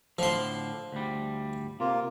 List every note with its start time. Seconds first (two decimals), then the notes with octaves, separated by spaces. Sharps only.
0.19 A2 D3 F3 C6
0.92 D2 G3
1.80 C3 A#3 F4